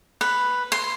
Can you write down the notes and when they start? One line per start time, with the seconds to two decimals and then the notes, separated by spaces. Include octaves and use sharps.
0.21 B4
0.72 C6